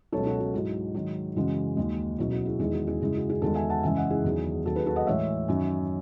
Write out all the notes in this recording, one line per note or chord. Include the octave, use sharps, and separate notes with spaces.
C#2 B2 F#3 A4 C#5
F#4 A4
F#4
G#2 F#3 E4
G#2 D#3 F#3
F#2 C#3 E3 G#3 F#4
D#2 D#3 G#3
C#2 B2 F#3 E4
F#4
E4 G#4
E2 D#3 G#3 E4 G#4
F#4
E4 G#4
F#2 C#3 G#3 E4
F#4
G#4
E2 D#3 G#3 F#4 A4
E5 G#5
F#5 A5
F#2 C#3 E3 G#3 E5 G#5
D#5 F#5
E4 G#4
E2 D#3 F#3
D#2 D#3 F#3 F#4 A4
G#4 B4
F#4 A4
D#5 F#5
A2 E3 G#3 C#5 E5
F#2 D#3 F#3